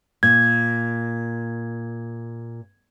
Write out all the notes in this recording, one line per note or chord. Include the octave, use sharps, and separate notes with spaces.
A#2 G#6